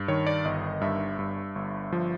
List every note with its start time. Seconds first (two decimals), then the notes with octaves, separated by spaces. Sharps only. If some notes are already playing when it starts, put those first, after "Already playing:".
Already playing: G2
0.08 D#3 C#5
0.27 D5
0.45 G1 D#5
0.81 G2 E5
1.19 G2
1.55 G1
1.92 F3